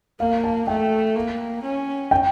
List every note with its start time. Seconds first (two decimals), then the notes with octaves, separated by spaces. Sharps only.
0.20 A#3 F5
0.44 A5
0.67 A3 G5
1.15 A#3
1.63 C#4
2.11 G5